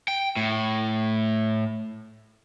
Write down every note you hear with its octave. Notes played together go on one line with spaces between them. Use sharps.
G5
A2